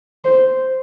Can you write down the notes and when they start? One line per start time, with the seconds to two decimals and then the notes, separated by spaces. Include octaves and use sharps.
0.25 C5